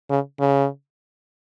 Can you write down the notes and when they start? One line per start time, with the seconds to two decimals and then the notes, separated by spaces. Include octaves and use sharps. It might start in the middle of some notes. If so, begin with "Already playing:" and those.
0.10 C#3
0.40 C#3